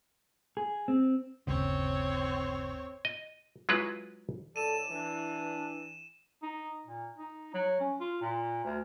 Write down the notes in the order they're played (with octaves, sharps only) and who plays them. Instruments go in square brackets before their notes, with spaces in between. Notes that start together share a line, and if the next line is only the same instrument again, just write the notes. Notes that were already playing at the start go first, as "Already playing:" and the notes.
[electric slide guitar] G#4
C4
[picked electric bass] G1 D#2 C#3 [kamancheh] C4 C#5
[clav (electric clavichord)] D#5
F#3 G#3 E4 F4 B4
[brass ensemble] C#2 D5 [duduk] A4 [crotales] D#7 E7
[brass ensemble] E3 [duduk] D4
[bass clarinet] D#4
A#2
D#4
F#3
C#4
F4
A#2
D2